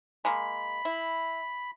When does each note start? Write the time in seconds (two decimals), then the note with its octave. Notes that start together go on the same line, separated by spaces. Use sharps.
0.25 G#3 A#3 B5
0.85 E4